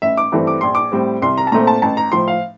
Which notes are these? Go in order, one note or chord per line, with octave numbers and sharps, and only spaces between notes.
A1 E5
D6
G2 E3 A3 C4
D6
A#1 C6
D6
A2 G3 C4
C2 C6
A#5
A5
A#2 A3 C4 A#5
A5
A1 A5
A#5
A2 F3 C6
F5